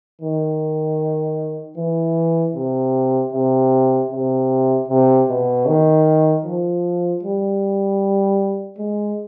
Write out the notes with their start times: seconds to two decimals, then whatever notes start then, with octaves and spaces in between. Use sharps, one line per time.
0.22 D#3
1.77 E3
2.55 C3
3.33 C3
4.12 C3
4.89 C3
5.29 B2
5.67 D#3
6.45 F3
7.23 G3
8.79 G#3